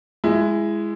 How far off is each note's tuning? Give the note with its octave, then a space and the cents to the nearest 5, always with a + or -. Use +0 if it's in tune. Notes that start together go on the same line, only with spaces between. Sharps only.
G#3 +0 E4 +20